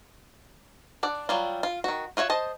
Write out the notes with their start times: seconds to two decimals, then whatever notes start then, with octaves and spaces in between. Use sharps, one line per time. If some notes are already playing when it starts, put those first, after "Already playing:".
1.03 D4 D5 F#5
1.29 F#3 G3 F4
1.63 F4
1.84 D#3 F#4
2.17 F4 F#4 C#5 E5
2.30 C5 D#5 A5